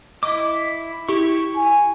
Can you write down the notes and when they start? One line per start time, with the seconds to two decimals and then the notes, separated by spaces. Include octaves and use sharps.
0.23 E4 D#5 D6
1.09 E4 G4 C#6
1.56 G#5